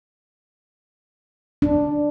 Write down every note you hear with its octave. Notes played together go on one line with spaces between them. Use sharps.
D4